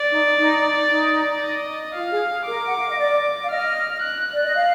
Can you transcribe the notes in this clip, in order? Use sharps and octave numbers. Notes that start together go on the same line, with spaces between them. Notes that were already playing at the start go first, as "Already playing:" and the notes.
Already playing: D5
D#4
D#4
D#4
D#5
F4 F5
G#4
G#4
A#4 D6
F#5
F5
D#5
D5
F5
D#5 F6
F#6
D5
D#5
F5